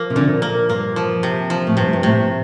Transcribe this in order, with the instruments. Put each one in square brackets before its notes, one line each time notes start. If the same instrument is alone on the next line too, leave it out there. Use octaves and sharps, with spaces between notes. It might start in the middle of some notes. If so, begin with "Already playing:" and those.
Already playing: [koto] F3 A#3
[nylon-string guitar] C3
[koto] A#2 [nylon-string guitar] D3
[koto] A#3
[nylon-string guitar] G2 [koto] A#3
[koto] F3
C3
F3
[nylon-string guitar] A2
[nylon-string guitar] G2 [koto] C3
[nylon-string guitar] G2
[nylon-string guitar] A2 [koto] C3